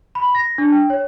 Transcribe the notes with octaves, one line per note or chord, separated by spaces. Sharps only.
B5
A#6
D4
G5
C#5